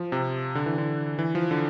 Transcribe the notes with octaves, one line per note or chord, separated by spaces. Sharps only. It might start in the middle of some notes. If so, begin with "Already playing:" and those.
Already playing: F3
C3
D3
E3
D3
E3
F3
D3